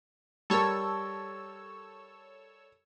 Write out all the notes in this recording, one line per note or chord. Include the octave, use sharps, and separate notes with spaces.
G3 A4 A#4 C#5 E6